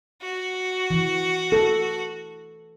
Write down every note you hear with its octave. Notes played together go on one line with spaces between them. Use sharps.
F#4
E3
A4